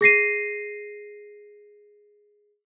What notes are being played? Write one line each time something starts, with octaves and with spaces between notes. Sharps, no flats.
G#4 A#6 C7 D#7